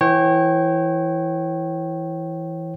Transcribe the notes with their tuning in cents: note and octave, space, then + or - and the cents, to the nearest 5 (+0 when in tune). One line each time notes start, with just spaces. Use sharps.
E3 +0 C#5 -30 G5 -25